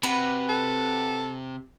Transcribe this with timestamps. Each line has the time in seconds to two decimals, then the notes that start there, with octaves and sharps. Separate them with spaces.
0.03 C3 F#4 B4
0.49 A4